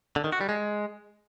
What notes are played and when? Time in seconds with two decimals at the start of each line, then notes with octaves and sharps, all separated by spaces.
0.16 D3
0.24 D#3
0.32 F#4
0.41 G3
0.49 G#3